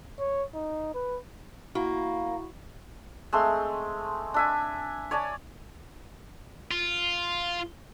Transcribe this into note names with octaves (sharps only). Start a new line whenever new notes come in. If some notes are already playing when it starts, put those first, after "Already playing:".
C#5
D#4
B4
A#3 E4 F#4
G#3 A3 C4 C6
D4 E5 G#5
C#5 D5 G#5 A5
F4